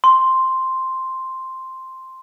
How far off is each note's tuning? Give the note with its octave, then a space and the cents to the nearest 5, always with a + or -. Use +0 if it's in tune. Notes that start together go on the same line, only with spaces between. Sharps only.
C6 +0